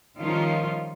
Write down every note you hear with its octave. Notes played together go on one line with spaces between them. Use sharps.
D#3 F3 G3 C#4 D#4 F4